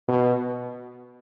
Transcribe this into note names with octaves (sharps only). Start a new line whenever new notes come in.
B2